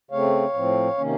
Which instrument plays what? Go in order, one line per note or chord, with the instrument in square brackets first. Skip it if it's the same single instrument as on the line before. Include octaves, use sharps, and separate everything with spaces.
[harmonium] C#3 A3 C4 C#5 F5
A2 F3 C4
C3 D#3 A#3 C#4